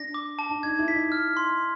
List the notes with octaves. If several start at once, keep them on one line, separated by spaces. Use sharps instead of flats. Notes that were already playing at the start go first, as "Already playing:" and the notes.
Already playing: D4 A#6
D6
A5
D4
D#4 G#6
E4
B6
D#4
F6
C6